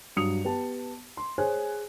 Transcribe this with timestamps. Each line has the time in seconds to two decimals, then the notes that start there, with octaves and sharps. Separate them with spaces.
0.16 G2 F#3 D#6 C#7 F7
0.45 B3 G4 A5
1.17 C6
1.38 G#4 C5 C#5 G#5 F#6